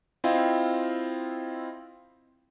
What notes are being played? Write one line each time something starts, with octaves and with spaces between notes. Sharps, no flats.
C4 E4 F4 D#5 F5 G5